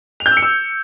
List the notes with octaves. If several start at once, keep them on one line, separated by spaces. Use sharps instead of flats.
F7
G6
E6
C#7
E6